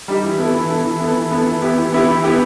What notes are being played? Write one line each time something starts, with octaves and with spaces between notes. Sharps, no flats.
G3 D#4 G4
E3
B3 E4 A4
E3
B3 E4 A4
E3
B3 E4 A4
E3
B3 E4 A4
E3
B3 E4 G4
E3
B3 E4 G4
E3
B3 E4 G4